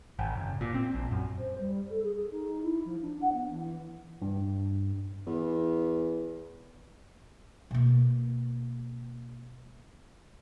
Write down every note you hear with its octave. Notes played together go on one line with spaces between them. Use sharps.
G#1
F#1
A#2
C4
A#1
F#2
C5
G3
A4
G#4
G#4
D#4
E4
F3
D4
F#5
B3
E3
G2
E2
B2 A#3